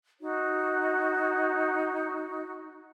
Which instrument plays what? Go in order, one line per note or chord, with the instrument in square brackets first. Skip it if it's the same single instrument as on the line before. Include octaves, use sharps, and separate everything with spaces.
[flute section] D#4 F#4 C#5